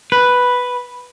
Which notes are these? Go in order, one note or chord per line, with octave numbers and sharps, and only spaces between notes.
B4